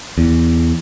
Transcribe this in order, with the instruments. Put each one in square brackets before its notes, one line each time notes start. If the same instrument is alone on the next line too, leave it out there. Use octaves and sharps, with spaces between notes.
[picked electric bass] E2